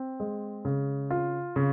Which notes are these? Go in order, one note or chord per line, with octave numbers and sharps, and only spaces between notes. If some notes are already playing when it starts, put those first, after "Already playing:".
Already playing: C4
G#3
C#3
F4
C#3